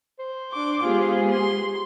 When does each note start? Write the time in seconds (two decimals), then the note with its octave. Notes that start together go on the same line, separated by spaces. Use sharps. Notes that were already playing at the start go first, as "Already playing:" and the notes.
0.20 C5
0.52 D4 D6
0.83 G#3 B3 F4 G4 G#4
1.30 C6